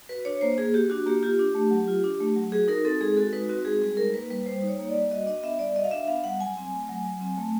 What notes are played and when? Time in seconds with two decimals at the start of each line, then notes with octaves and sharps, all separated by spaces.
0.09 F#4 B4
0.25 D4 C#5
0.41 A#3 C5
0.58 A#3 G#4
0.74 F#4 G4
0.90 D4 F#4
1.06 A#3 G4
1.23 F4 G4
1.39 D4
1.55 A3
1.71 F#3
1.88 F4
2.04 D4
2.20 A3
2.36 F#3
2.52 F#4 G#4
2.68 D#4 A#4
2.85 C4 A4
3.01 G#3 G#4
3.17 F#4 A4
3.33 D#4 B4
3.49 C4 F#4
3.65 G#3 G#4
3.81 G3 G#4
3.97 D#4 A#4
4.14 A#3 B4
4.30 G3 B4
4.46 G3 C5
4.62 D#4
4.68 C#5
4.79 A#3
4.89 D5
4.94 G3
5.11 F#4 D#5
5.26 D4 D#5
5.43 B3 E5
5.59 G3 D5
5.76 F#4 D#5
5.84 F5
5.91 D4 E5
6.08 B3 F5
6.24 G3 F#5
6.40 F#3 G#5
6.57 C4
6.73 A3
6.89 F#3
7.05 F#3
7.21 C4
7.38 A3